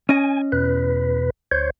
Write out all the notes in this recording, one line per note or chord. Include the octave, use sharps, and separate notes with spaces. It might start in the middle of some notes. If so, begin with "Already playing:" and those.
C#4 D#5 G#5
E2 B2 B4
D2 C5 C#5